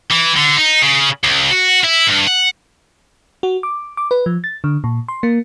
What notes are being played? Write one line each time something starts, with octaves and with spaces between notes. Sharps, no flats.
E3
D3
D#4
C#3
C#2
F#4
E4
G2
F#5
F#4
D6
D6
B4
F3
A6
D3
A#2
C6
A#3